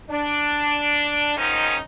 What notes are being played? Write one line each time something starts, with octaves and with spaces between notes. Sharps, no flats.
D4
G#2 D#3 F3 C#4 D#4